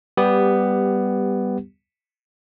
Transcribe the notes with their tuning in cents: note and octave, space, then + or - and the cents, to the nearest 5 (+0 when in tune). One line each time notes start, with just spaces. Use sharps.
G3 +0 B3 +5 G4 +10